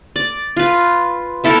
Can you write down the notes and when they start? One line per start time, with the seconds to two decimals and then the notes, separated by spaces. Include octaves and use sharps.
0.16 D5
0.57 F4 B4
1.44 B3 E4 A4 A#4